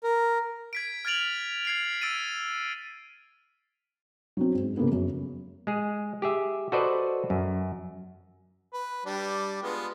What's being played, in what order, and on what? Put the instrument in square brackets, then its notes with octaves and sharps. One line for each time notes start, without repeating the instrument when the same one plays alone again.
[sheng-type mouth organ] A#4
[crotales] G#6 B6 D7
F6 G#6 A6 D7 F7 F#7
G#6 C7 D7
E6 A6 D7 D#7
[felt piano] F#3 C4
G#2
C#3 A#3 B3
F#2
[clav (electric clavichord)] G#3 G#4
G4 G#4 E5
F#4 A4 B4 C5 D5 D#5
F#2
[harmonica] B4
G3 D4
G#3 B3 F4